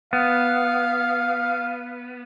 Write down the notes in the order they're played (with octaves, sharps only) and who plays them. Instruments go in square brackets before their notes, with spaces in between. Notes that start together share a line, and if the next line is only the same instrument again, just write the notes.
[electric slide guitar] B3 [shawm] F5